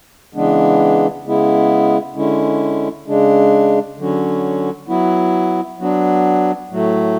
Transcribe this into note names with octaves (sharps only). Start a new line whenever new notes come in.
C#3 E3 G#3 B3 D4
C#3 G#3 B3 E4
D3 G#3 C#4 E4
C#3 G#3 D4
D3 F#3 C#4
F#3 B3 E4
F#3 B3 D4
A2 F#3 A3